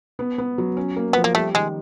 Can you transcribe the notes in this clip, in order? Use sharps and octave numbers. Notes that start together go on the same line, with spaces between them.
B3
B3
F#3
C#4
A#3
F3 B3
A#3
G3 A3
D#3 G#3